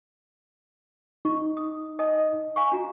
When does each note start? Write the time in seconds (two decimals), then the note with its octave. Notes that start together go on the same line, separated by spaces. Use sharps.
1.25 D#4 C#6
1.57 D#6
1.99 D#5 A5 D#6
2.56 F5 G#5 C#6
2.72 D4 F#4 A#5